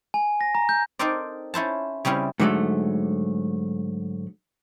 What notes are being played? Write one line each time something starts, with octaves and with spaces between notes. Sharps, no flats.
G#5
A#6
A#5
G6
C4 D#4 A4 A#4 C5 D5
C#4 E4 C5 A5
C#3 G3 C4 C#4 E4
G#2 D3 F#3 G3 A3